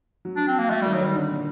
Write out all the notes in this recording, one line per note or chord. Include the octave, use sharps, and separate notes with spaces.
F#3
D4
C4
A#3
F#3 A3
D#3 G3
F#3
D#3 G3
D3
A#2